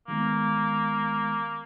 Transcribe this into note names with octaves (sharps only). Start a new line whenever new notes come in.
D#3 G#3 A#3 B3